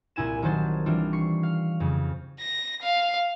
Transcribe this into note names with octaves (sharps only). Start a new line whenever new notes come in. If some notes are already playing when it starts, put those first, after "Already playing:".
C2 A#2 E4 G#5 E7
D#3 F#3 C5 A5
E3 G3 D4 F4
C#6 C7
F5
F2 C#3
A#6
F5